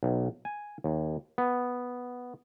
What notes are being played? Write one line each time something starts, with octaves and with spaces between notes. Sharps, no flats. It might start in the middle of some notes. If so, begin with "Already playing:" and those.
B1
G#5
D#2
B3